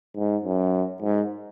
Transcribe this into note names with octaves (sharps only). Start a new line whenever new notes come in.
G#2
F#2
G#2